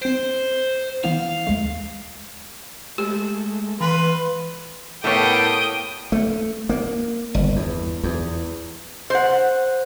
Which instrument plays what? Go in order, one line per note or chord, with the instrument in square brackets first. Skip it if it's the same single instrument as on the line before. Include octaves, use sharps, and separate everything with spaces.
[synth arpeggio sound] C4 D7 [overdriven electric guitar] C5
[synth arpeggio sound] E3 B3 E4 [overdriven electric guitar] F5
[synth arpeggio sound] D#2 G#3 A3
[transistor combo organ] G#3 A3 [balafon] G4
[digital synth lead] E3 [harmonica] B4 C6 [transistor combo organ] F5
[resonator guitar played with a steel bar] A2 B3 C#5 [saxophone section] A#3 G4 A4 [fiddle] G5 D#6
[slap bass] A3
A#3
G1
E2
E2
[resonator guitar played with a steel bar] C5 F#5